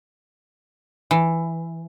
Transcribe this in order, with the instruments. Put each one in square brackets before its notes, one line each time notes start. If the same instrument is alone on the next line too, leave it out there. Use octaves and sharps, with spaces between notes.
[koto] E3